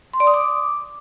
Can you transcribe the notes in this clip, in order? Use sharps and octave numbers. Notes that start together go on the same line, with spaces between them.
C6
D5
D#6
D6